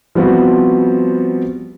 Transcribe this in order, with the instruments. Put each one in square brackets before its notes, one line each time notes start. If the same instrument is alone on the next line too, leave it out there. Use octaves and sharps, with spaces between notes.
[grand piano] F3 G3 B3 C4 E4 F#4